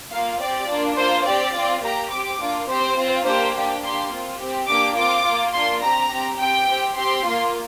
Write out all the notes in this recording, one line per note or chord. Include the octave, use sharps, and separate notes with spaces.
A#3 F4 F5
C4 G4 D5
A#3 D4 F4
A#3 F4 C5
C4 G4 D5
C4 F4
A#3 G4 A#5
C4 G4 D6
A#3 D4 F4
C4 G4 C5
C4 F4
A#3 D4 G4 C5
A#3 D4 G4
A#3 D4 G4 C6
C4 F4
C4 G4
A#3 D4 G4 D6
C4 F4 D6
A#3 F4
A#3 D4 F4 C6
C4 G4 A#5
C4 G4
C4 G4 G5
C4 G4
C4 G4 C6
A#3 F4